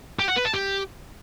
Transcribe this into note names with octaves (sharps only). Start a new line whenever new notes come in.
G4
F#5
B4
A5
G4